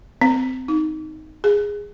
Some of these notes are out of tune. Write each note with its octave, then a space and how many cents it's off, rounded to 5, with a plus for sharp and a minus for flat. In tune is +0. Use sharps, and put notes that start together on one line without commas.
C4 -25
D#4 +0
G#4 -15